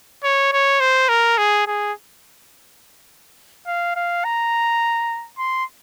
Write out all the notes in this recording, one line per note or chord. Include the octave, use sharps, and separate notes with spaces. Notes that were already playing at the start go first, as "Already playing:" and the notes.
C#5
C#5
C5
A#4
G#4
G#4
F5
F5
A#5
C6